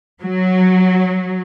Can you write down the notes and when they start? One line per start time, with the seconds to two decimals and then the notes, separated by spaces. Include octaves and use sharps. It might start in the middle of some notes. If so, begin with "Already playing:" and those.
0.22 F#3